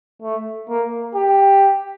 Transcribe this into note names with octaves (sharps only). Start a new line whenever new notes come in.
A3
A#3
G4